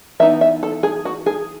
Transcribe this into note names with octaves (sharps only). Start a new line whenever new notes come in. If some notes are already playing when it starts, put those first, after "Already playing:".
E3 B3 D#4 E5
E5
A4
G#4
F#4
G#4